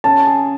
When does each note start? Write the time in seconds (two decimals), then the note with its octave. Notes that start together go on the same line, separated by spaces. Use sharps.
0.04 C#3 A5
0.27 G#4